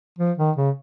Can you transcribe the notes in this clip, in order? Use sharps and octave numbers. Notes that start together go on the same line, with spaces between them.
F3
D#3
C#3